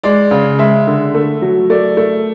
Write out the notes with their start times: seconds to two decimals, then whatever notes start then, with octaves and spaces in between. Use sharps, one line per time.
0.03 G#3 D5
0.31 C#3
0.59 G#3 E5
0.87 D3
1.14 A3
1.42 F#3
1.70 A3 D5
1.97 A3